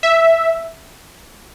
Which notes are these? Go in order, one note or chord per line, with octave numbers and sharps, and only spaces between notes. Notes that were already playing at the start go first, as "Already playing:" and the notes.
E5